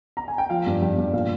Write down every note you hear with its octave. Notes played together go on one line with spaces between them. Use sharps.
A#5
G#5
G5
F3 F5
G2
G2 G5
G2
A#2 F5